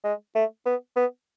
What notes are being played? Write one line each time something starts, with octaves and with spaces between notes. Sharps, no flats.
G#3
A3
B3
B3